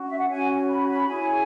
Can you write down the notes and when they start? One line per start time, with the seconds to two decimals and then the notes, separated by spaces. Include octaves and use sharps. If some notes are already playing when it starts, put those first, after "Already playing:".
Already playing: C#4 F#4
0.09 E5
0.19 F#5
0.29 C#4 F#4 C#5 G#5
0.69 B5
0.88 B5
1.08 E4 G#4 C#5 G#5